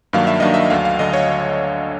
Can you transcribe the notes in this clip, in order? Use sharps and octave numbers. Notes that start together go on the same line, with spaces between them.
G2 D#3 F#3 A#3 D4 F5
E5
G2 D#3 F#3 A#3 D4 D#5
E5
D2 D3 F#3 F5
F5
D2 D3 F#3 D#5
C#5